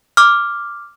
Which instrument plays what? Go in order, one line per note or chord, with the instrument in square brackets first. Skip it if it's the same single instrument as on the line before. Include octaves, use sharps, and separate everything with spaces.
[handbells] D6 F6